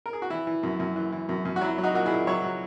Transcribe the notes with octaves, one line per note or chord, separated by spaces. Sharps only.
A#4
G#4
F#4
E3 E4
E3
F#2
F#2
E3
E3
F#2
F#2
F#4
F#3 E4
F#3
D#4 F#4
A#2 F#4
A#2 E4 G#4
F#3 C#5 E5
F#3